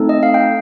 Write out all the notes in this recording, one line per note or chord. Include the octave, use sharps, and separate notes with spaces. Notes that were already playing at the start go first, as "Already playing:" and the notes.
Already playing: A3 C4 D#4 A4
D#5
F5
G5